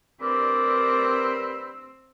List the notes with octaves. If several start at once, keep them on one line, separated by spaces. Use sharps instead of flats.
G2 C4 A#4 D5 B5 E6